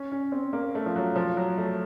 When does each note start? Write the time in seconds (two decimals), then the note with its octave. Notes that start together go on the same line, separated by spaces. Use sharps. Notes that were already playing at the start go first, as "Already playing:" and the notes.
Already playing: C#4
0.12 C#4
0.32 C4
0.53 A#3
0.75 A3
0.86 F3
0.96 F#3
1.16 F3
1.37 F#3
1.58 A3